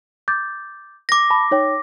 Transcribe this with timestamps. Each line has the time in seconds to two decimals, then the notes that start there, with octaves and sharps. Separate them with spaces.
0.28 D6 G6 A6
1.09 D6 A#6
1.30 A5 B5
1.51 D#4 C#5 G5